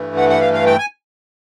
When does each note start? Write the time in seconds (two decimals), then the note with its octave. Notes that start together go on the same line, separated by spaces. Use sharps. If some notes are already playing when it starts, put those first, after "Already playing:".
Already playing: G2 E3 A3
0.17 F#5
0.30 F#5
0.41 F5
0.53 F5
0.66 G5
0.79 G#5